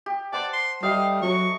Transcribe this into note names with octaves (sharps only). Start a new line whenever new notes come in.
G4
C5 D5 F#5 A5
C6
G3 A3 G4 D#5 F5
F#3 C#6